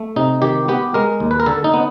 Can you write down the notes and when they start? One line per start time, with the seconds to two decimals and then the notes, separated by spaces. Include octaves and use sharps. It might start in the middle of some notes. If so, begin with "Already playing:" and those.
Already playing: A3
0.16 C3 D#4
0.42 D#3 G4
0.68 B3 G4
0.94 G#3 A#4
1.20 D#2
1.31 B4
1.40 A#4
1.46 D3 A4
1.64 D#4
1.74 B3